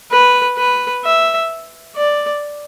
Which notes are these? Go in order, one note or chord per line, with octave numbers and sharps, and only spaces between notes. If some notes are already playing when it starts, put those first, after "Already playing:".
B4
B4
E5
D5